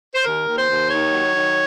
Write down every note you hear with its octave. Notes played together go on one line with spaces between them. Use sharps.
C5
D#2 A#4
D#2
C5
D#2
D#3 C#5
F#3
D#3